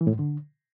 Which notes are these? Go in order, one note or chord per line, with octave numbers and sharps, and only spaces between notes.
E3
A2
G#2
D3